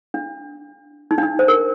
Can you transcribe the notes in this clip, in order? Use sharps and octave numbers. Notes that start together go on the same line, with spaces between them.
D4
D#4
D4
D#4
C5
A#4